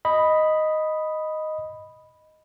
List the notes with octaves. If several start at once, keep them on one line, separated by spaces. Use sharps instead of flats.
D#5 B5